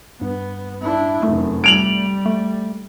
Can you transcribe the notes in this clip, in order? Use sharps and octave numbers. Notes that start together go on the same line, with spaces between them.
G2 B3
D4 E4
F1 F#2 A3
G3 D7 F7 F#7
A3